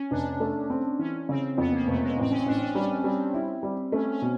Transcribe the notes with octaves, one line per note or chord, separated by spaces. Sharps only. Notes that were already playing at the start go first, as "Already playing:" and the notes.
Already playing: C#4
F1 D4
A3
C4
E3 C#4
C#3 C4
F2 B3
A#3
F1 A3
G#3
A1 C4
C#4
A1 D4
C#4
G3 C#4
G3 C4
E4
G3
A3 C#4
C#4
B2